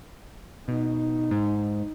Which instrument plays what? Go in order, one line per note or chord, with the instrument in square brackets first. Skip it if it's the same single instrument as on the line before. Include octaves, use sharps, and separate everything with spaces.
[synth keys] B2 [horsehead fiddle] D#4
[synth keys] G#2